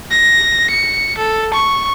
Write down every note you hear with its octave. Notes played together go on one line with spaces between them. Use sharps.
A#6
C#7
A4
C#6